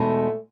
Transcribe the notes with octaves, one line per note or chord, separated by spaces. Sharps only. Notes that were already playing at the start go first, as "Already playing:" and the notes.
Already playing: E2 B2 G#3 A3 D#4 A4